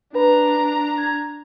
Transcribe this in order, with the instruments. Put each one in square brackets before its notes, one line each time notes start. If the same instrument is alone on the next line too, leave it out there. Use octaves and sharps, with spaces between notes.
[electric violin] D4 A#5 [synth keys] B4
[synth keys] G#6